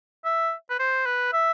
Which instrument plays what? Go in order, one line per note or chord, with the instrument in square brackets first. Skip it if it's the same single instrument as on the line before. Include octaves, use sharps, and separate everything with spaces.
[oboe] E5
B4
C5
B4
E5